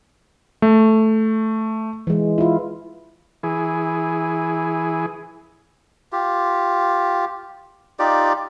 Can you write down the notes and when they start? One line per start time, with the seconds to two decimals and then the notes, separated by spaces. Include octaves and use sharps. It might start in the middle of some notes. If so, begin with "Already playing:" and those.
0.62 A3
2.07 E3 G#3
2.38 E4 F4
3.43 E3 G#4
6.12 F4 G4
7.99 D#4 F4 G4 D5